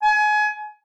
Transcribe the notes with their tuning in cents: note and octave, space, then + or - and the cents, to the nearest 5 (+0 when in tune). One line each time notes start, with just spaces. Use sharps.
G#5 +30